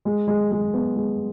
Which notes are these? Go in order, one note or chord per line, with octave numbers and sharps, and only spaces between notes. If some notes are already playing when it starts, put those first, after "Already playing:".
G#3
G#3
G#3
B3
G#3